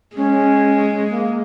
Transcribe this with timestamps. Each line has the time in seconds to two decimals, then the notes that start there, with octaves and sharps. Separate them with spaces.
0.17 G#3 C#4
1.10 A#3